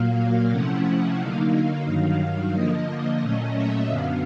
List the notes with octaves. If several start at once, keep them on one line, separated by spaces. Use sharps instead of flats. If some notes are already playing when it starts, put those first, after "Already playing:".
Already playing: A#2 F#3 A#3 F5
C3 F3 A3 C#4 E4 F#5
D3 F#3 A#3 D#4 F5
G2 D#3 F#3 F5
D3 F3 A#3 D#5
A#2 F#3 A3 C#4 D#5
E5
F#2 D3 F#3 B3 F5